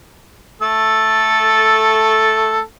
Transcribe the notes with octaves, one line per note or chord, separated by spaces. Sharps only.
A3 A4